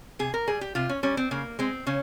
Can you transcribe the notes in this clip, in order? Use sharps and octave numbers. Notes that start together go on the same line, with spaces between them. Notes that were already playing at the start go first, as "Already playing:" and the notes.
C3 G#4
A#4
G3 G#4
G4
C3 F4
C#4
G3 C#4
C4
C#3 A#3
G#3 C4
C#3 C#4